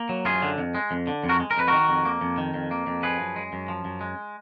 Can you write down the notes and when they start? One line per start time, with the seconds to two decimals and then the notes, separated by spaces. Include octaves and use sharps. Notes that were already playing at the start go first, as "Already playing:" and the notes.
Already playing: A#3
0.09 F#3
0.25 F#2 F4 G#4
0.42 D3
0.58 F2
0.75 G#3
0.91 F2
1.07 D3
1.24 F2
1.29 F#4 A#4
1.40 G#3
1.51 A#4
1.57 F2 B4
1.68 D#3 F#4 A#4
1.89 F2
2.05 A#3
2.21 F2
2.38 D#3
2.54 F2
2.71 A#3
2.87 F2
3.03 F3 G#4 B4
3.20 F#2
3.36 G#3
3.53 F#2
3.68 F3
3.85 F#2
4.01 G#3